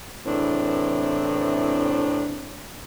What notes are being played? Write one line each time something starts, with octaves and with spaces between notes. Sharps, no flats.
E2 A2 C3 E3 C4 D4